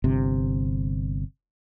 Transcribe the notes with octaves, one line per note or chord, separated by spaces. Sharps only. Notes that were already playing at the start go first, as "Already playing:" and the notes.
G1 C3